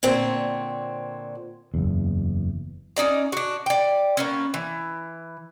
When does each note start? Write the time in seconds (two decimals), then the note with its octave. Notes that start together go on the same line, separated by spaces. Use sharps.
0.03 A#2 D3 C4 C#5
1.74 F#1 E2
2.96 C#4 D#4 D5 A#5
3.32 D4 F#4
3.66 D5 G5
4.17 A#3 B3 C#4
4.54 E3